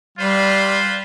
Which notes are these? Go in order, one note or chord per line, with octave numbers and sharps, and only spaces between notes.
G3 F4 B4 C5